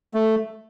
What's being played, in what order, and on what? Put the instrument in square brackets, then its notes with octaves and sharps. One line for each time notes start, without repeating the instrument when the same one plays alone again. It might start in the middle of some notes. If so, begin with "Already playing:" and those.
[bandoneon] A3